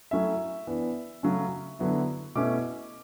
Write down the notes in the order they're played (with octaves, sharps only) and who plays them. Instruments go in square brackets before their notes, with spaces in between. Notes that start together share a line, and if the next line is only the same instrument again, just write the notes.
[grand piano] F#3 A3 C#4 E4 E5
E3 B3 D4
C#3 F#3 A3 C#4
D3 F#3 B3 E4
B2 A3 C#4 E4 D6